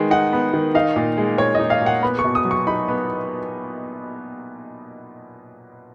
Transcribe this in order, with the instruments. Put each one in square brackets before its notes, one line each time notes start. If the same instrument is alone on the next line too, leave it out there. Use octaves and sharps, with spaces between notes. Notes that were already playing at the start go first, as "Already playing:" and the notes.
Already playing: [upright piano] D#3 G#3 B3
D#4 F#5
B3
D#3
D#4 F5
A#2
G#3
A#2 C#5
D#5
D#4
F5
A#2
F#5
B3 B5
C#6
B2
D#6
F#3
C#6
D#4 B5
B3